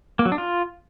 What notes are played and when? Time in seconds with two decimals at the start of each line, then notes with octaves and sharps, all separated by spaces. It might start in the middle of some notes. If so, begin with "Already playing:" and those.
0.19 A#3
0.25 F#3
0.32 D4
0.38 F4